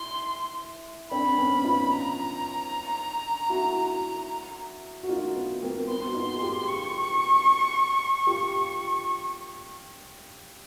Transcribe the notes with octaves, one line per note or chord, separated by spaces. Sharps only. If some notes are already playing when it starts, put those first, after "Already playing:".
Already playing: E4 C6
C4 D4 B5
B3 C#4
D#4 F4
A#5
E4 F#4
F#4
D#4 F4
B3
A#3 C4
B3 C6
F#4
D#4 F4
G#4
F4 G4
C#6
F4 G4